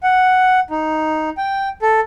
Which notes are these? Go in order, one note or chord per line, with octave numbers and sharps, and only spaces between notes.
F#5
D#4
G5
A4